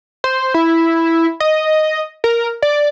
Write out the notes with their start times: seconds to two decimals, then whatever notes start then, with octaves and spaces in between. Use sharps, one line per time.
0.24 C5
0.54 E4
1.40 D#5
2.24 A#4
2.62 D5